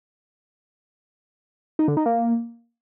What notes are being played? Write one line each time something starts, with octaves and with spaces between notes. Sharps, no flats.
D#4
D3
D#4
A#3